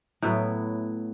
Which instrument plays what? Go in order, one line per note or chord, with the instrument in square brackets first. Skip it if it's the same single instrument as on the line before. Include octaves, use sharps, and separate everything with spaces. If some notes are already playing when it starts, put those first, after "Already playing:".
[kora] A2 F#3 B3 E4